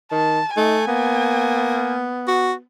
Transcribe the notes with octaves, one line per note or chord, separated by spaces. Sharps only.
D#3 A5
A3 D#4 G#5
A#3 B3
F#4